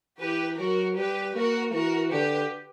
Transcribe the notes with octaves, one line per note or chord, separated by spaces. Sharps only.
E3 G4 B4
F#3 F#4 A#4
G3 G4 B4
A#3 F#4 A#4
E3 F#4 A#4
D3 G4 B4